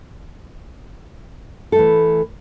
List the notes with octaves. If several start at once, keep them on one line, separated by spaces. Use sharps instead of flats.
E3 A3 A4